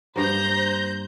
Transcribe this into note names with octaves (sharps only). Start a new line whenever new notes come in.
G2 A#3 C5 A#5 G6